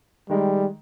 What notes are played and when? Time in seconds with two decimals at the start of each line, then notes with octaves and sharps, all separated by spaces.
0.30 D#3 G3 G#3